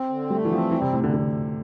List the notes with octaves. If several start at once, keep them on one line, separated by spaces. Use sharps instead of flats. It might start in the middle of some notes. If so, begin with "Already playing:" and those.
Already playing: C4
D3
G3 A3
E3
F3 C4
E3 G3
C3
E2 A2
D3
D3